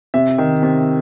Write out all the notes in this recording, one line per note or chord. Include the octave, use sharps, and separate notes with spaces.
C3 E5
D#3
C3